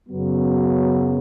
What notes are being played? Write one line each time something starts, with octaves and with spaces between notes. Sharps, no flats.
F#2 C#3 F#3 B3